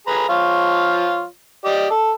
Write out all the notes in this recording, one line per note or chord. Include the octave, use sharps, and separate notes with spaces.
G#4 B4 A#5
F3 F4 C#5
G4 D5 D#5
A4